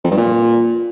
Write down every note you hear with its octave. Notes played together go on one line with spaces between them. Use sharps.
F2
G2
A#2